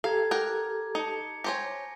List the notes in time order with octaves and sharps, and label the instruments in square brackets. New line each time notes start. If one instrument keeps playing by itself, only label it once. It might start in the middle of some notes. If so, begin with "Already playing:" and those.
[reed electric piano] G4 A4 [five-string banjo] F5 [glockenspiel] A#5 G#6
[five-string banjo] A#4 F#5 G5 [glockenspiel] A#5 D6
[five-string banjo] D#4 [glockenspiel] A5 C#7
[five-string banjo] G4 C5 C#5 [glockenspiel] G#5 A#6